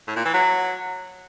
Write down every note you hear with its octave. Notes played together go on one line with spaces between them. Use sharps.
A2
A#2
E3
F#3